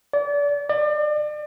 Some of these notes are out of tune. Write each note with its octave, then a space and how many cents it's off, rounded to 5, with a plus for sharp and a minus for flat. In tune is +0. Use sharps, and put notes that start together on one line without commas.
D5 -35
D5 +35